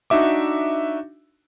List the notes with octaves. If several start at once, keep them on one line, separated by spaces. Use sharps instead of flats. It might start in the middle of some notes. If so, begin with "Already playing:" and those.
D4 D#4 F#4 E5 D6